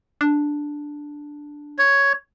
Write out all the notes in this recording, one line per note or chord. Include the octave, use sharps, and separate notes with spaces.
D4
C#5